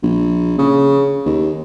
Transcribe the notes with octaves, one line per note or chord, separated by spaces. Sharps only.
A#1
C#3
D#2